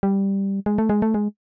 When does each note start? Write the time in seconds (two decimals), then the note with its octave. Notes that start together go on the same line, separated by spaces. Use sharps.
0.03 G3
0.66 G#3
0.78 A3
0.90 G#3
1.02 A3
1.14 G#3